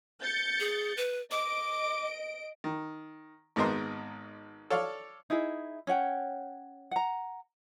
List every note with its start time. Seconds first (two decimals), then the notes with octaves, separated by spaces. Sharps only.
0.22 G6 A6 C#7
0.60 G#4
0.97 B4
1.31 D#5 D6 D7
2.64 D#3
3.56 G#1 G#2 B3 A#4 D#5 C6
4.70 A4 C#5 D5 F5
5.30 D#4 E4 G#4 E5
5.87 C#4 C#5 F#5 G5
6.91 F#5 A#5